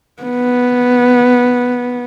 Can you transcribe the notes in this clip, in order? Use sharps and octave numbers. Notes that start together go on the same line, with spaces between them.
B3